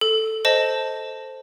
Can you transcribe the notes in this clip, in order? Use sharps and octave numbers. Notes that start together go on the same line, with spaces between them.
A4
C5 D#5 A5